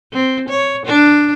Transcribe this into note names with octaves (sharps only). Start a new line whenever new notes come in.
C4
C#5
D4